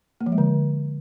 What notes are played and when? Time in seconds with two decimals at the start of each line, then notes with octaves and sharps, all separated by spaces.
0.21 A#3
0.26 F3
0.32 G#3
0.38 D3